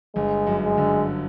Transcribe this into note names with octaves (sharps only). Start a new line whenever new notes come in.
G1 G#3
F#2
G#3
D3